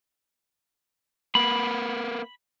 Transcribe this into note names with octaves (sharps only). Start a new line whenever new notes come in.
A#3 B3 B5